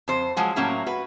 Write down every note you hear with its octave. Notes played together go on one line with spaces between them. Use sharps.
F2 C5
F3 F#3 G#3 F#4
A2 F#3 A#3 C#4 E4
F#4 B4